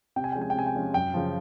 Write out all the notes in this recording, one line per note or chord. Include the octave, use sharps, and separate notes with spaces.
C3 G5
G#5
F3 G#3 C#4 G5
G#5
G5
C3 G#5
G5
F3 G#3 C#4
F#2 G5
C#3 F3